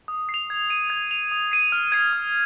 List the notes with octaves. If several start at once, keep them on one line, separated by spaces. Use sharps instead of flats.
D#6
C7
F7
G#6
D#7
G#6
F7
D#6
C7 D#7
F6
G#6 C7 D#7
D#6